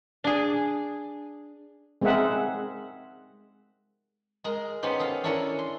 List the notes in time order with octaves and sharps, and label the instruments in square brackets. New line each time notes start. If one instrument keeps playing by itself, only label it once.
[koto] D4 G#4
[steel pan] G#3 C4 G#4 A#4 E5 F#5
[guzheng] G#3 G#4 A#4
B3 C#4 D#4 G4 C5
G#4 A4 F5
C#4 D4 E4 A4 A#4 C#5
C6